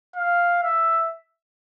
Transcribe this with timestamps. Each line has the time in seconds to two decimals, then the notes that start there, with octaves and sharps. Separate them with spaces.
0.16 F5
0.63 E5